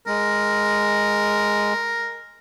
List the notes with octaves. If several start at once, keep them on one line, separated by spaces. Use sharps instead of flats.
G#3 A#4